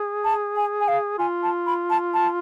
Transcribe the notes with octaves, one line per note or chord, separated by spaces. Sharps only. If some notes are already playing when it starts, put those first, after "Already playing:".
Already playing: G#4
A5
G#5
G#5
F5
F4 G#5
A5
B5
A5
A5